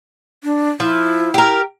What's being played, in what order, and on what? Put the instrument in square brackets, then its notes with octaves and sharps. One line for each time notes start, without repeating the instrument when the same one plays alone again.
[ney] D4
[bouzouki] F3 [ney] E4
[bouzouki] G4 A#4